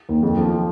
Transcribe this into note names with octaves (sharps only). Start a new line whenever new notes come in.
D#2
F2
F3